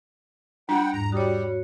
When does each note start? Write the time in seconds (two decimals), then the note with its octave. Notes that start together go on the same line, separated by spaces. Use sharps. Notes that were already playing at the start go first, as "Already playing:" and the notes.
0.69 G3 D4 F4 F#5 G5 B5
0.93 E2 G#2 G3 A#5
1.12 G3 F#4 C#5 D#6